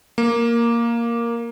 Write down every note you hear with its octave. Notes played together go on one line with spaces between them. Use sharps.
A#3